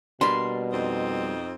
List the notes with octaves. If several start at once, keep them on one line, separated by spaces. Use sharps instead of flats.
B2 G3 A#3 D4 C6
F2 C4 D#4